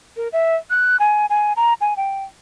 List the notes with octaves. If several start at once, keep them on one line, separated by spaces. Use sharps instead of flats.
A#4
E5
F#6
G#5
G#5
A#5
G#5
G5